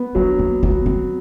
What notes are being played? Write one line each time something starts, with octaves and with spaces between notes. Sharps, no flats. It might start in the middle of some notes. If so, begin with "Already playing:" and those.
Already playing: B3
F#3 D4
A#3
F#3 B3
C4